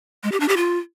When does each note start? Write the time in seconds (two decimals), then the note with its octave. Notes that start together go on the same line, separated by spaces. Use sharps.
0.23 G#3
0.32 G4
0.40 D4
0.49 G4
0.57 F4